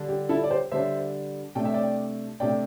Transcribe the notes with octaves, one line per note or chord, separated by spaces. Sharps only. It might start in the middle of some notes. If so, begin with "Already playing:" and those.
Already playing: D3 G3 D4
G4
E4 A4
D5
G4 C5
D3 G3 D4 C5 E5
C3 A3 D4 G5
E5
D5 G5
C3 A3 D4 D5 G5